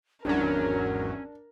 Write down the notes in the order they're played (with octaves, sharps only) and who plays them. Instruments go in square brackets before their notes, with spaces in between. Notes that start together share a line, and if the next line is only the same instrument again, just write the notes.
[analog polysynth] G#1 E2 F#3 [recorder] C#4 [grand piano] D4 [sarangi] A#4